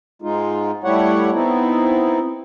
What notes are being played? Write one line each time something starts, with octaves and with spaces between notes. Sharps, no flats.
G#2 G#3 D#4 F4
G3 A3 E4 G4 C#5 F#5
B3 C4 D#4 E4